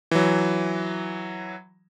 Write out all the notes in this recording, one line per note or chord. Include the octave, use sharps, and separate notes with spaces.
E3 F#3